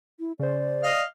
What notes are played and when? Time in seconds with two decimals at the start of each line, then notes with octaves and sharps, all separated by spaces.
0.20 E4
0.39 C#3 C5 D5
0.83 D#5 F5